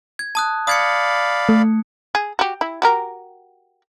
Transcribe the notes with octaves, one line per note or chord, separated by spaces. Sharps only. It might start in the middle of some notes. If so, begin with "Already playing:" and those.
G#6
A5 D#6 F#6
D5 F5 B5 D#6 G#6 C#7
A3
G#4
F#4 G4
E4
F#4 G4 A#4